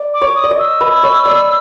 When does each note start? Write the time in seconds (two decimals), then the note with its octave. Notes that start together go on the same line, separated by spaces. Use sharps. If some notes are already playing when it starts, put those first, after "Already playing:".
Already playing: D5
0.14 D6
0.21 C#5
0.36 D#6
0.44 D5
0.51 D#5
0.59 E6
0.81 B4
1.03 C#5
1.25 D5